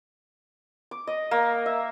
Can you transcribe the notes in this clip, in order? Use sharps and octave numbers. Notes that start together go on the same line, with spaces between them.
D6
D#5
A#3
E5